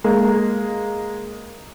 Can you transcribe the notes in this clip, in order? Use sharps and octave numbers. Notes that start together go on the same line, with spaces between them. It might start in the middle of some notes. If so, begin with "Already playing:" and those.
G#3 A#3